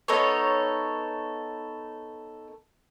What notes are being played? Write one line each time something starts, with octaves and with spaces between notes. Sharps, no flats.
B3 D#4 A4 C#5